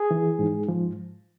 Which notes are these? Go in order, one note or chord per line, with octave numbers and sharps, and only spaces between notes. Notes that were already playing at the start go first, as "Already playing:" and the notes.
Already playing: G#4
E3
G#2
F3